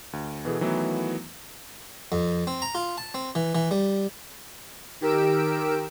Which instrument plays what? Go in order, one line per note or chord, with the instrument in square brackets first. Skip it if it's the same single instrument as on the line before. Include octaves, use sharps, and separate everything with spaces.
[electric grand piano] D2
B2 E3 G#4 A4
D#3 E3 F#3 A3 B3 E4
[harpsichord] F2
C4
A#5
F4
A5
C4
E3
E3
G3
[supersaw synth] D#3 G4 A#4 E6 D7